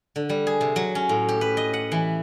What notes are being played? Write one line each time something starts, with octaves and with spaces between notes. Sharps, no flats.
D3
G3
G#4
C3
F#3
C#4
A2
G4
B4
D#5
F#5
E3